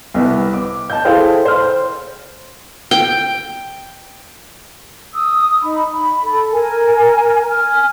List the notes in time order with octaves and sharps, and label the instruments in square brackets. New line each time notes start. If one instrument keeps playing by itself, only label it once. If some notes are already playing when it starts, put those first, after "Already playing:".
[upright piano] C2 B3
D6
A5 G6
E4 G#4 A4 C5 F5 G5
C5 F6
[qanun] G5
[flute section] D#6 E6
D#4 B5
B5
A4
A#4 G#5
G#5 F6